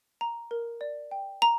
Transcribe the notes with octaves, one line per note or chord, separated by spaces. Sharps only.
A#5
A#4
D5
G5
A#5